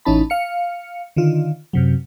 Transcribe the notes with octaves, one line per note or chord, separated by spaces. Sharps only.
A1 E3 C#4 D#4 A5 B5
F5 C#7
D3 D#3 F4
F#2 C3 F#3